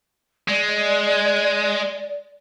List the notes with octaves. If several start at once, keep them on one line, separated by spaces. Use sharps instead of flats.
G#3 D5